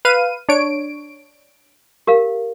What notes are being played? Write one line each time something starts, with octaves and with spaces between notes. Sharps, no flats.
B4 F5 D#7
D4 C#5 D7
G4 A#4 F5